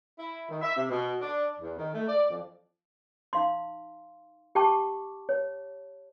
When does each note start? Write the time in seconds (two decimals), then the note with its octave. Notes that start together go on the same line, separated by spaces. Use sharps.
0.19 E4
0.49 D#3
0.62 E5
0.77 C3
0.90 B2
1.21 D4
1.60 E2
1.78 D#3
1.94 A3
2.08 D5
2.30 F2
3.33 D#4 F5 C6
4.55 G4 G5 A5 C#6 D6
5.29 C#5